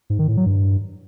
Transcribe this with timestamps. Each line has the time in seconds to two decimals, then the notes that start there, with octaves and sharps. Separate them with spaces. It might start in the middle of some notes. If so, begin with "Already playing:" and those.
0.10 G#2
0.19 D#3
0.28 A2
0.37 F#3
0.46 G2